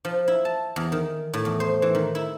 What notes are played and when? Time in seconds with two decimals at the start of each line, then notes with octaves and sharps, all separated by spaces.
0.05 F3
0.28 E4
0.45 A5
0.76 E2
0.92 D#3
1.33 A2
1.45 E2
1.60 C5
1.82 E3
1.95 D#3
2.15 E4